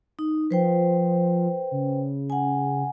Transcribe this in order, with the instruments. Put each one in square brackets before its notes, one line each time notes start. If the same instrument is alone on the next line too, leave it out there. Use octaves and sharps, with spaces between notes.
[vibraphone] D#4
[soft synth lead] F3 [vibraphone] B4 C5 G5
[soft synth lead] C#3
[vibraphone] F#5 G#5